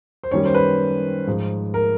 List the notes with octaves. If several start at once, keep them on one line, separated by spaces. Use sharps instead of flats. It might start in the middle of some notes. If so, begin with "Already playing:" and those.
C5
F#2 D#3 G3 C#5
C5
B4
G#2 F3
A#4